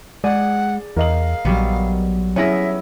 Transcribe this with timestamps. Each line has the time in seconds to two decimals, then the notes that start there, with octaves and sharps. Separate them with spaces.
0.24 G#3 G#4 D5 F#5
0.97 E2 A#4 D#5 F5 F#7
1.45 A#1 F#3 G3 B3
2.36 B3 C#4 E4 G#4 E5 A#6